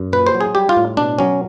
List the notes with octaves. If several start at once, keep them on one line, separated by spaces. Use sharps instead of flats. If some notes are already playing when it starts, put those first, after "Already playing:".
Already playing: F#2
A#2 B4
C5
F#3
G#4
G3 G4
F4
A2
B2 D4
F#3 C#4